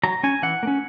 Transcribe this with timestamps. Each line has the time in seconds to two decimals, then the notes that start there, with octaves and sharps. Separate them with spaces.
0.03 F#3 A#5
0.23 C#4 G#5
0.42 E3 F#5
0.63 A#3
0.67 C#4